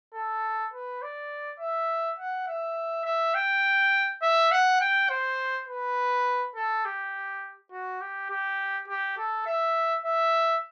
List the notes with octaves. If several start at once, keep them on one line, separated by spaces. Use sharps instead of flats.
A4
B4
D5
E5
F#5
E5
E5
G5
E5
F#5
G5
C5
B4
A4
G4
F#4
G4
G4
G4
A4
E5
E5